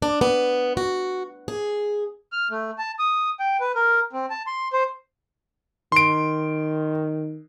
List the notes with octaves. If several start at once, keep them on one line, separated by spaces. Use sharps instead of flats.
D4
B3
F#4
G#4
F6
A3
A5
D#6
G5
B4
A#4
C4
A5
C6
C5
D#3 C6 D7